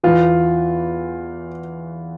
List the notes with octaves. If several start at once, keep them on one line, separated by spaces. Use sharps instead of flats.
E2 E3 F4